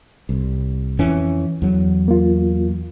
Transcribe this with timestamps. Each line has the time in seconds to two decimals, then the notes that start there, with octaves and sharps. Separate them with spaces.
0.29 C2
0.99 F2 E3 C#4
1.62 E2 F#3
2.08 A#3 F4